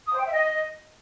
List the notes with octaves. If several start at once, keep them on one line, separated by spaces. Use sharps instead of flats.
D#6
C5
G5
E5
D#5